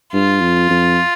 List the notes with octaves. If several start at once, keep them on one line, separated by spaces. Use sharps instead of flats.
G2 F4
F2
F2